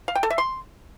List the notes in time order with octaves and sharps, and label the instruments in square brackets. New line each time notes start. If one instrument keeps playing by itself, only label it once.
[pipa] F5
G5
A4
E5
C6